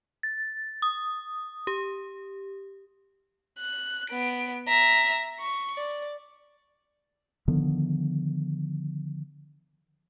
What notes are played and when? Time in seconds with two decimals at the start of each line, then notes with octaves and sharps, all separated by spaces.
0.23 A6
0.82 D#6
1.67 G4
3.59 F#6
4.10 B3 D7
4.68 E5 A#5
5.40 C#6
5.76 D5
7.48 D3 D#3 F3 B3